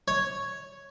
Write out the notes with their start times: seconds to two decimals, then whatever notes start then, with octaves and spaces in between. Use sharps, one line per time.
0.08 C#5